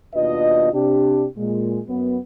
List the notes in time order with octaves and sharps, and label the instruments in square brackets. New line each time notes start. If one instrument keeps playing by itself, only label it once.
[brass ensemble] D#2 B2 D4 F4 B4 D#5
C3 D4 G4
A#2 G#3
F#2 B3